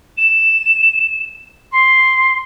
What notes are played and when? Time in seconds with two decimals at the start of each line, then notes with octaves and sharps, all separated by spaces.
0.17 E7
1.71 C6